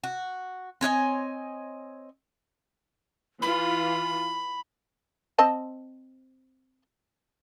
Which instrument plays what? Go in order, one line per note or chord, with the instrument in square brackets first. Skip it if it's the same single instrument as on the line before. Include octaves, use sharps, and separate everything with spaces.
[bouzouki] F#4
C4 C#5 D#5 G#5
[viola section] E3 F4 [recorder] B5
[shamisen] C4 D#5 A5